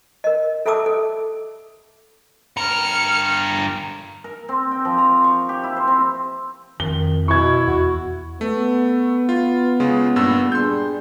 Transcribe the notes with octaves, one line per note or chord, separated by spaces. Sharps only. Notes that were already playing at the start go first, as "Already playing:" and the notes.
A#4 D#5
A4 E5 G5 A5 D6 E6
A4
G2 A#4 F6 C#7
A#4
C4
G5
F3
A#5
C#6
G4
E4
C5
C4
F2 D#3 G7
B2 E4 C#6 G#6
E2 F#4
A3 B3
F4
C#3 G#3 F4
G2 A#2 E6
G3 D4 G#4 C6 G6